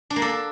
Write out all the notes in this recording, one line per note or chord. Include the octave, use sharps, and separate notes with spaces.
D4
A#3
A4